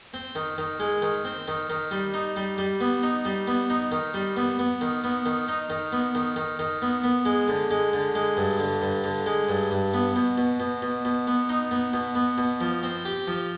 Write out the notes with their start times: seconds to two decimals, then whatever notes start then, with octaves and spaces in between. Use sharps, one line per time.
0.14 C4
0.35 D#3
0.58 D#3
0.80 G#3
1.02 D#3
1.25 C4
1.48 D#3
1.70 D#3
1.91 G3
2.14 D#4
2.36 G3
2.58 G3
2.81 B3
3.03 D#4
3.25 G3
3.47 B3
3.70 D#4
3.92 D#3
4.14 G3
4.36 B3
4.59 B3
4.81 D#3
5.04 B3
5.26 D#3
5.48 D#4
5.70 D#3
5.92 B3
6.15 D#3
6.36 D#3
6.59 D#3
6.82 B3
7.04 B3
7.25 G#3
7.48 D3
7.71 G#3
7.93 D3
8.15 G#3
8.37 G2
8.59 D3
8.82 G2
9.04 D3
9.26 G#3
9.49 G2
9.71 G2
9.94 B3
10.16 B2
10.38 B2
10.60 B2
10.82 B2
11.05 B2
11.27 B3
11.49 D#4
11.71 B3
11.93 B2
12.15 B3
12.38 B2
12.61 F3
12.83 C4
13.05 G4
13.27 F3